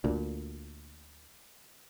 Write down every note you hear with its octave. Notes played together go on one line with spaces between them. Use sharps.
D2 A#2